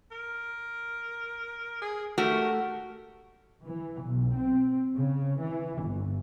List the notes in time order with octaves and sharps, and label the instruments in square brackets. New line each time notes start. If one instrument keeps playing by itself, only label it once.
[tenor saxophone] A#4
G#4
[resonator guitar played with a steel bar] A3 F#4 G4 [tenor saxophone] A#4
[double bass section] E3
B1
C4
C#3
E3
G1